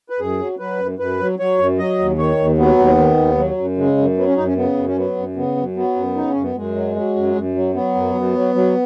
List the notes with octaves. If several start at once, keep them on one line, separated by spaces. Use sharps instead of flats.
B4
F#2 G#4
F#3
F#3 B4
F#2
F#2 B4
F#3
F#3 C#5
F#2
F#3 D#5
D#2
D#3 C#5
D#2
F#3 B3
D#2
D#3
D#2
F#3
F#2
C#3 G#3
F#2
F#3 B3
C#4
F#2 D#4
C#4
C#3 B3
F#2
C#4
F#3 B3
F#2
C#3 B3
F#2
F#3 B3
F#2
C#3 D#4
C#4
F#2
B3
F#2 G#3
F#3
F#3
F#2
F#2
F#3
F#3 B3
F#2
F#2
F#3
F#3